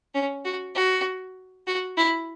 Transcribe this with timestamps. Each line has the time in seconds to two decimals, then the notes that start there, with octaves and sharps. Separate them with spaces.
0.14 C#4
0.45 F#4
0.75 F#4
1.67 F#4
1.97 E4